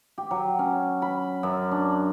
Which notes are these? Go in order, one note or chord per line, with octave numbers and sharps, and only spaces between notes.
G4
F#3
C#4
B5
F#2
D4